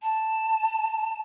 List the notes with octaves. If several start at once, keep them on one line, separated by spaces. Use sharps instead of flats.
A5